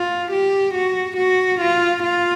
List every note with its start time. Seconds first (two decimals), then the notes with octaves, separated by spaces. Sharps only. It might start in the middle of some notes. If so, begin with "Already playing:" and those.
Already playing: F4
0.32 G4
0.74 F#4
1.17 F#4
1.60 F4
2.03 F4